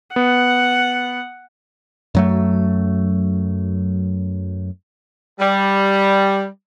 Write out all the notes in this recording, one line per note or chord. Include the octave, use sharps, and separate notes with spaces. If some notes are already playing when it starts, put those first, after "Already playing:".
B3 F#5
F#2 F#3 A3
G3